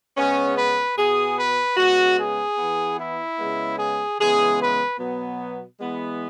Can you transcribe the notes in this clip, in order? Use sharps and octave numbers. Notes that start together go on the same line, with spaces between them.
C#3 G#3 B3 C#4
B4
B2 B3 G#4
B4
C#3 G#3 B3 F#4
G#4
E3 B3
E4
C#3 G#3 B3
G#4
C#3 E3 G#3 B3 G#4
B4
B2 F#3 B3
E3 G#3 B3